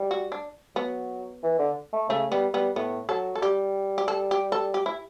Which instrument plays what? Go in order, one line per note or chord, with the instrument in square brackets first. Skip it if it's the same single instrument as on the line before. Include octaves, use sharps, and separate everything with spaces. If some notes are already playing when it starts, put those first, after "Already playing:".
Already playing: [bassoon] G3
[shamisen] F#4
D4
[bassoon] F#3 [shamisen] B3
[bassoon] E3
D3
A3
[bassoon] C#3 [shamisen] A3
[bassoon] G3 [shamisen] B3
[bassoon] G3 [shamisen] B3
[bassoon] A2 [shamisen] B3
[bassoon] F#3 [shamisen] A4
[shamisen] A4
[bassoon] G3 [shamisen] G4
[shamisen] G4
A4
G4
A4
G4
E4